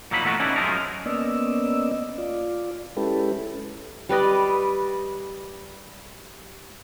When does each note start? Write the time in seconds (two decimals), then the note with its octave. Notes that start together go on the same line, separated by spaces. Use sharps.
0.11 A#2 F3 F#3 A#3 D#4 B5
0.25 E3 A3 B3 F#4 A#4 B4
0.39 C#4 D#4 E4 A4 B4 D5
0.56 F#2 F3 G#3 A3 A#4
1.06 A#3 B3 C#4 D5 D#5 E6
2.18 F4 D5
2.97 G#3 C#4 E4 G4 A4 B4
4.09 G3 B4 D5 D#5